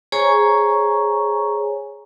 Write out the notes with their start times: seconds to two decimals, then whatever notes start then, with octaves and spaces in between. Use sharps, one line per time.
0.12 G#4 C5 C#5 G#5 A#5 C#6